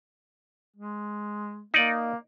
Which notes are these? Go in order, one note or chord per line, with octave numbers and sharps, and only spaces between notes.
G#3
A#3 D#4 D5